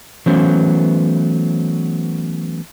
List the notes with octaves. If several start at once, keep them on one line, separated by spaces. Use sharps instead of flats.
E3 F#3 A3 B3 C#4 C5